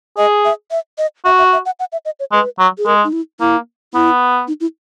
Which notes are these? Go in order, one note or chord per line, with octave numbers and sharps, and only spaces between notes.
G#4 D#5
E5
E5
D#5
F#4 E5
E5
E5
F#5
F#5
E5
D#5
C#5
G#3 B4
F#3
G#4
G#3 A#4
D#4
E4
A#3 E4
B3 E4
D#4
E4